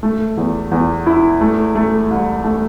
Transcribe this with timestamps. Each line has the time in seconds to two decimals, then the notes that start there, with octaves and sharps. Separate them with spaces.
0.03 A3
0.37 E2
0.71 E2
1.06 E4
1.41 A3
1.75 A3
2.10 C2
2.44 A3